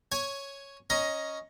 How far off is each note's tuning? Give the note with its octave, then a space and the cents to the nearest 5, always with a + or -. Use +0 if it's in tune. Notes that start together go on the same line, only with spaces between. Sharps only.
C#5 +0 G#5 +10
C#4 +0 D#5 +10 A#5 +15